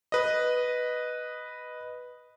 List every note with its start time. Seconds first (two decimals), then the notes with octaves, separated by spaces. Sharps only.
0.12 B4 D#5